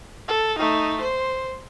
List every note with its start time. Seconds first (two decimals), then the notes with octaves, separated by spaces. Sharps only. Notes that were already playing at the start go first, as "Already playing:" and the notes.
0.29 A4
0.59 A3 D#4
1.02 C5